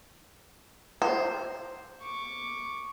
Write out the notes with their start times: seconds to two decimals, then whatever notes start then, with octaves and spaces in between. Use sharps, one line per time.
1.02 C5
2.01 C#6 D6